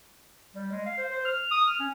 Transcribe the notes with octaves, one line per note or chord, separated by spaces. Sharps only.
G3
G#3
F5
C5
C5
F6
D#6
F6
C#4